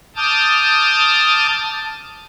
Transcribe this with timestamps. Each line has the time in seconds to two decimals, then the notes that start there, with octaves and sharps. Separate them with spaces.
0.16 A5 D6 D#6 F6 G6 A6